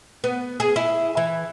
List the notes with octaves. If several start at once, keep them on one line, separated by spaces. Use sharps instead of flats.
B3
G#4
E4
E3